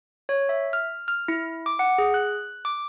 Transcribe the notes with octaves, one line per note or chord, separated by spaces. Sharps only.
C#5
E5
F6
F6
E4
D6
F#5
G#4
F#6
D6